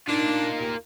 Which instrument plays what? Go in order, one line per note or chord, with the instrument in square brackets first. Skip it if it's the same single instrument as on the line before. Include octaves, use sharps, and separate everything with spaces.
[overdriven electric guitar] A#3 F4 [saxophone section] D4 [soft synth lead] D#4
[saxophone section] D#2